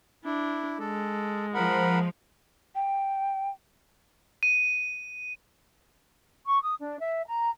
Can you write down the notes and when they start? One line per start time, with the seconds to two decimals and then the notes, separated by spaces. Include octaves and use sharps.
0.25 D4 E4
0.80 G#3 A4
1.55 F3 A#4 F#5 B5
2.75 G5
4.43 D#7
6.46 C#6
6.62 D#6
6.81 D4
7.00 E5
7.27 A#5